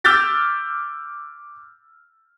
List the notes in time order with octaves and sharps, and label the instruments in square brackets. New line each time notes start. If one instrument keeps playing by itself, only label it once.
[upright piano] D6 E6 F6 G6 A6 B6